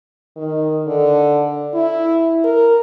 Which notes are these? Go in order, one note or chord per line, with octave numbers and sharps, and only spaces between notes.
D#3
D3
E4
A#4